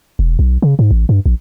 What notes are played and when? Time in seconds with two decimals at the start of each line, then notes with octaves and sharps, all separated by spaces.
0.19 E1
0.39 B1
0.62 C#3
0.79 G#2
0.91 A1
1.09 G2
1.26 A#1